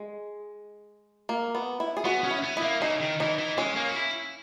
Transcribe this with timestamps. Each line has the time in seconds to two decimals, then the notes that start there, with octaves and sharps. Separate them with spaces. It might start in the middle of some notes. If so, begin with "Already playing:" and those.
Already playing: G#3
1.29 A#3
1.55 B3
1.80 E4
1.97 G#4
2.05 B3 F#4
2.24 C#4
2.31 E4
2.44 B3
2.57 E4
2.63 A#3
2.81 C#3 D#4
3.00 D#3
3.20 E3 D#4
3.39 E3
3.58 G#3 C#4
3.76 A#3
3.89 F#4
3.96 E4